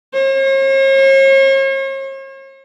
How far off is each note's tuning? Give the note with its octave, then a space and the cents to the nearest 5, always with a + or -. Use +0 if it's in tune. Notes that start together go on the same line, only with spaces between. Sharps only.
C#5 -45